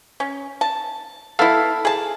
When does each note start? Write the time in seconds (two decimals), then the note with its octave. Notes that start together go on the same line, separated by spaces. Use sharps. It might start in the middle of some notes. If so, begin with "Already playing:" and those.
0.20 C#4
0.61 A5
1.39 B3 E4 A4 F5
1.85 G#4 A5